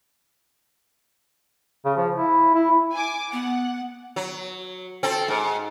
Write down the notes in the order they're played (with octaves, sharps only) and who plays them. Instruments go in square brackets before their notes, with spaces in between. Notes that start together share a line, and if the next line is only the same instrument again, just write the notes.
[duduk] C#3
F3
E4
E4
[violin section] G#5 D6
[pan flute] B3 [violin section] F#5
[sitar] F#3
C4 A4
G#2